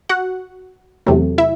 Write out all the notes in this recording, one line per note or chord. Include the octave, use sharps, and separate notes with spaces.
F#4 F#5
E2 C3 F#3 A3
E4 E5